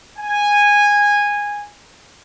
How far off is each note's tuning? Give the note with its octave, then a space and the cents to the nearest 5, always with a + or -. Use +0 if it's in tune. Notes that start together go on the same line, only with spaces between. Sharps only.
G#5 -15